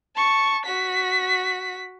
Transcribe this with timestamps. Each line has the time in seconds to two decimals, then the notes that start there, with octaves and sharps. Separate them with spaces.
0.16 A5 C#6
0.65 F#4 B6